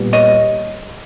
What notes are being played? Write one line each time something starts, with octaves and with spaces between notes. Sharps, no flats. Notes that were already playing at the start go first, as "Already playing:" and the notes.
Already playing: A#2 G3 B3
C#5 D#5